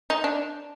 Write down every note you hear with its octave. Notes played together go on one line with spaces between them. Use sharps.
D#4
D4